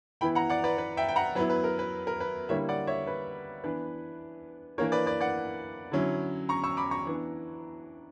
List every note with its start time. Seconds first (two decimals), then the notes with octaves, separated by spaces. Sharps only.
0.21 E3 B3 E4 G5 B5
0.35 F#5 A#5
0.50 D5 F#5
0.64 B4 D5
0.78 B4
0.97 E5 G5
1.09 G5
1.16 F#5 A#5
1.35 F#3 B3 E4 B4
1.50 B4
1.64 A#4
1.79 B4
2.07 A#4
2.20 B4
2.49 D3 G3 A#3 E4 C#5 E5
2.69 D5 F#5
2.87 C#5 E5
3.07 B4
3.64 E3 B3 D4 B4
4.78 E3 A#3 D4 A#4 C#5
4.92 B4 D5
5.06 B4 D5
5.21 D5 F#5
5.92 D3 F#3 C#4 E4
6.49 A#5 C#6
6.64 C#6 E6
6.77 B5 D6
6.91 A#5 C#6
7.06 E3 B3 D4